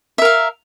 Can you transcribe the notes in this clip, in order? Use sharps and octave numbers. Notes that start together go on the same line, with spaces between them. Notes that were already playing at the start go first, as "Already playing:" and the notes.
A#4 E5 F5